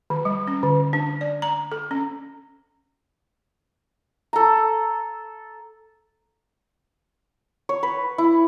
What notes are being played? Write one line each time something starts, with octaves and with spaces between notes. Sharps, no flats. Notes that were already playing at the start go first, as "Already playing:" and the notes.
D#3
G3
C#4
D3
D4
D5
A#5
A4
C#4
A4 A#5
C#5
B4
E4